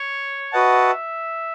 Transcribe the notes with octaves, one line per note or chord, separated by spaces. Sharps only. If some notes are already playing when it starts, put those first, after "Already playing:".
Already playing: C#5
F#4 B4 D#5 E5 F#5 A5